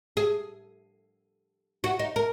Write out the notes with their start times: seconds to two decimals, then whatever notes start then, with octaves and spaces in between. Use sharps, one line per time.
0.17 G#4
1.84 F#4
1.99 D#4
2.16 A#4